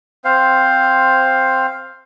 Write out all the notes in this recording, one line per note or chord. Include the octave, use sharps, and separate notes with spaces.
C4 C5 F5